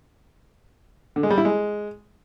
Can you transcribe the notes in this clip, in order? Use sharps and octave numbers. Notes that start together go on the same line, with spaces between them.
D3
G#3
G3
E4
G#3